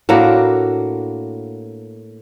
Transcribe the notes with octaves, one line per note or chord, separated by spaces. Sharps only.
A2 A#3 D4 F#4